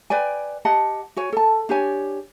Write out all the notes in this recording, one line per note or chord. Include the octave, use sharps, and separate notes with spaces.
B4 D5 G5 G#5
G4 D#5 F#5 A5
F#4 C#5 G#5
A4 A5
D4 G4 C#5 G#5